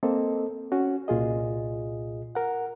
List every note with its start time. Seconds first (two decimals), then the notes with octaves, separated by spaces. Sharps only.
0.03 A#3 C4 A4 D#5
0.72 C#4 F#4
1.08 C2 A#2 F4 G#4 D#5
2.35 A#4 F#5